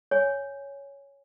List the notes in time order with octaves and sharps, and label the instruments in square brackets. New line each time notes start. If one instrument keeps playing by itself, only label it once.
[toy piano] C#5 G#5